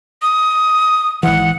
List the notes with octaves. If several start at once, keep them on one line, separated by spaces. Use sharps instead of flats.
D#6
G#1 E3 F#5